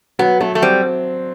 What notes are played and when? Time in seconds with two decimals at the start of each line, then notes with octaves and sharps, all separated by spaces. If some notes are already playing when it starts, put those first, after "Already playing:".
0.19 F#3 B3
0.40 F#3 A3
0.55 A3
0.62 G3 C4